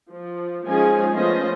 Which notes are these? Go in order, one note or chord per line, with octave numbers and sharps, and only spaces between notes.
F3
F3 G#3 C#4 D#4 G#4 G#5
F3 A3 B3 C#4 C5 D#5